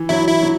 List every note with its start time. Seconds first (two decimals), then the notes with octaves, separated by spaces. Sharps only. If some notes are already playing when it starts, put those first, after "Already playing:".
Already playing: E3
0.09 F#3 E4
0.28 E4
0.42 F#3